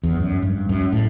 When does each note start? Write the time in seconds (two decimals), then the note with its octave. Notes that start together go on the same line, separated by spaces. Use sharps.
0.03 E2
0.20 F#2
0.43 G2
0.69 F#2
0.93 A2